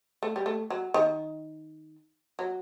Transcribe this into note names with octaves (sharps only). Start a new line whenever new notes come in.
A3
G3
A3
F#3
D#3
F#3